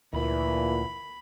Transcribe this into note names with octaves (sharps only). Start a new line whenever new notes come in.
D2 A#2 E3 B5